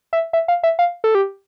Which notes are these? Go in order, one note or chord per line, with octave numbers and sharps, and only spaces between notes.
E5
E5
F5
E5
F5
A4
G4